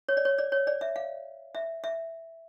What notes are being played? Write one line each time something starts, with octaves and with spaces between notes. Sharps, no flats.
C#5
D5
C#5
D5
C#5
D5
E5
F5
E5
E5